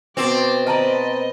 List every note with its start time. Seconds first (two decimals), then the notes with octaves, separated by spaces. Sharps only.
0.17 B2 C4 A5 C6 D6
0.67 B4 C5 D5 D#5 A5 A#5